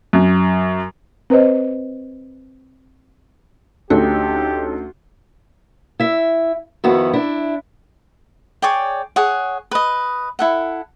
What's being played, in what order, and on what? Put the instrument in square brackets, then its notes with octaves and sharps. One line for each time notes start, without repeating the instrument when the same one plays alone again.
[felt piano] F#2
[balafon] C4 B4 C5 D#5
[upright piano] D2 [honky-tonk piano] C#4 D#4 A4 [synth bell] F#4 [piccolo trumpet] G4
[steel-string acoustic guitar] E4 E5
F2 D#3 B3 E4 F#4
D4 E4
[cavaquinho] G#4 C#5 D5 G5
G#4 C#5 F#5
B4 D#5
E4 A4 F#5